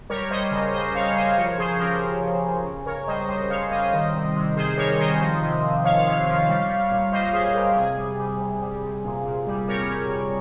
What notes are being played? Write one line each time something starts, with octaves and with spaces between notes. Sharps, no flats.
G3 A#4 C#5
G3 C5 D#5
C#3
G3 C5 D#5
C#3 C#5 F5
G3 C5 D#5
F3 A#4 C#5
C#3 G#4 C5
F3 G4 A#4
F3
C#3
C#3
C#3
C#3 A#4 C#5
G3 C5 D#5
G3 C5 D#5
C#3 C#5 F5
G3 C5 D#5
D#3
C3
C3
D#3 G#4 C5
G3 A#4 C#5
D#3 C5 D#5
F3
C3
C3
F3 C#5 F5
C3
F3
G3
G3
A#2
G3 C5 D#5
G3 G#4 C5
G3 G4 A#4
C3 G#4
G3
G3
C3
G3
C3
A#2
A#2
G3
G3 A#4 C#5
G3
G3